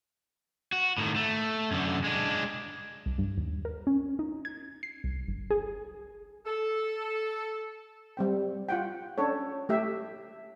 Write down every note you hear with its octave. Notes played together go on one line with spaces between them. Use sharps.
F#4
A2 D#3
A3
F#2 D3
G#3 D4
C2
G2
D#2
A#4
C#4
D#4
G#6
C7
C2
G1
G#4
A4
G3 C4 G5
F4 F#5 G5
C#4 D4 A4 C#5
A3 G4 E5